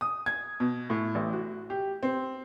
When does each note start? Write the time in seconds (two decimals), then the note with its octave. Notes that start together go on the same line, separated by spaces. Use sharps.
0.01 D#6
0.26 G#6
0.60 B2
0.90 A2
1.15 A1
1.33 F#4
1.70 G4
2.03 C4